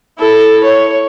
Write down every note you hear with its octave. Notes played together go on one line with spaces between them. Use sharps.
E4 A4
C#5